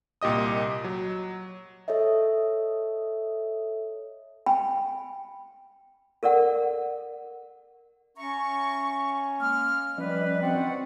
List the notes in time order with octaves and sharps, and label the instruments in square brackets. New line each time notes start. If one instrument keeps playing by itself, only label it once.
[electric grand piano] C2 A#2 G4 D#5 D#6
F#3
[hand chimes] A4 C#5 D#5 E5
[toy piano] G5 G#5 B5
A4 A#4 D5 F#5
[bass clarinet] C#4 [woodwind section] E5 A#5 C#6
[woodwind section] G#3 A#3 F6
[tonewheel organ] F3 C#4 D#5 [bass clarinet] G3 [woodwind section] B4
[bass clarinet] C4 [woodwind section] F#4 D5 F#5